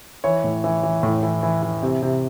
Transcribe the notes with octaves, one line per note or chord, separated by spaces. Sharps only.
E3 C#5
A2
E3
E3
A2
E3
E3
E3
C3
C3